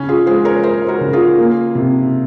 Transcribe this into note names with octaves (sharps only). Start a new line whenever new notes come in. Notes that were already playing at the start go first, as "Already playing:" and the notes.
Already playing: C#3 C#4
F4 G#4
G#3 G#4 C5
A#4 C#5
G#3 G#4 C5
F#4 A#4
C#3
F4 G#4
A#3
C3